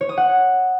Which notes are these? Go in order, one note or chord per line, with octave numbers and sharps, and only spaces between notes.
C#5
D#6
F#5